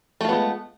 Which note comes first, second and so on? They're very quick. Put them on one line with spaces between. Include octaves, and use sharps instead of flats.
A3 F4 B3 G#3